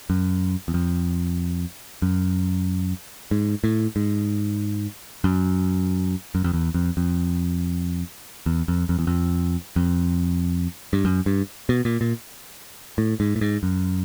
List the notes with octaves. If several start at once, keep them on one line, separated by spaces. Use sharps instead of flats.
F#2
E2
F2
F#2
G#2
A2
G#2
F#2
F#2
F2
E2
F2
F2
E2
F2
F2
E2
F2
F2
G2
F#2
G2
B2
A#2
A#2
A2
G#2
A2
G#2
F#2